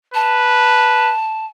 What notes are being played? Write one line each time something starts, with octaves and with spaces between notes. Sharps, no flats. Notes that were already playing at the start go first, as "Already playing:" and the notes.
B4 A5